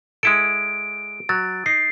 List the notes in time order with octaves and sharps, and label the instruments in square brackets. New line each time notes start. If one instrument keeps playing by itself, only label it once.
[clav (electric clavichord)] G#3 E4 A4 [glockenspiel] D7
[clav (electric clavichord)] F#3 [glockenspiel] A6
[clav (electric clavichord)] D#4 [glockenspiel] C7